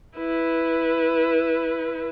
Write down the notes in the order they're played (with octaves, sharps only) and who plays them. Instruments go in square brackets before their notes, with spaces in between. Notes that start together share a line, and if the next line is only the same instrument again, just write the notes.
[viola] E4 B4